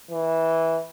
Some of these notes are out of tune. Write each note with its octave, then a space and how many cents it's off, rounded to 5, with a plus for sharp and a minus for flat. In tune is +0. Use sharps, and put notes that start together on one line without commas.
E3 -15